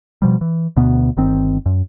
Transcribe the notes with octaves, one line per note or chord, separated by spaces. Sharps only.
B2 F3 G3
E3
D2 B2 B3
G1 D#3 C4
F#2